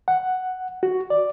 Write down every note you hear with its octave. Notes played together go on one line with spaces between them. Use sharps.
F#5
F#4
D5